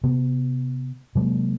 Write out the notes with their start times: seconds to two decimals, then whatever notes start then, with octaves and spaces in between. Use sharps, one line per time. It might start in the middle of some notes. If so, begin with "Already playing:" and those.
0.03 C3 B3
1.15 C3 F#3 G#3 A#3